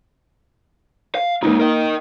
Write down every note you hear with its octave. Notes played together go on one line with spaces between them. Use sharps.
F5
C3 G#3 A#3 D#4
A#4 D#5